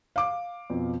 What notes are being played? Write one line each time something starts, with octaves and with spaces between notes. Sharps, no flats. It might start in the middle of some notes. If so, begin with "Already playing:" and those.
F5 D6
F2 B2